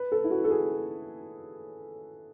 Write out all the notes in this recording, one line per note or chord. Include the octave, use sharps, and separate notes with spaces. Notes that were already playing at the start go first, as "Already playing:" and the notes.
Already playing: B4
A4
E4
F#4
A4
G#4